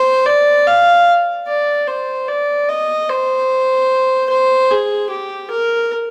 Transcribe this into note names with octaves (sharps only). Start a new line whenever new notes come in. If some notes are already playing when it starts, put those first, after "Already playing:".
Already playing: C5
D5
F5
D5
C5
D5
D#5
C5
C5
G#4
G4
A#4